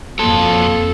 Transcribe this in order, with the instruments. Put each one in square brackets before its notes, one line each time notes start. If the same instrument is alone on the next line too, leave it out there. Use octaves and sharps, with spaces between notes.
[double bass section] F2 [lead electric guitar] F3 F#3 [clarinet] A#3 [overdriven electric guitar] A4